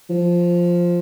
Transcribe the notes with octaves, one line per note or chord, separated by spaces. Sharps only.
F3